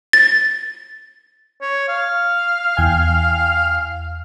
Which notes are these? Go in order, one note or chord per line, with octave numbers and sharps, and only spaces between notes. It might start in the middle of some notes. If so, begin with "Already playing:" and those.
A6
C#5
F5
E2 G5 G#5